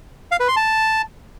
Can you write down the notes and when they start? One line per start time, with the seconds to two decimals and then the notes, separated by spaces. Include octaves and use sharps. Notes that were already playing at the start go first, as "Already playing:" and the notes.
0.32 F5
0.40 B4
0.48 C6
0.56 A5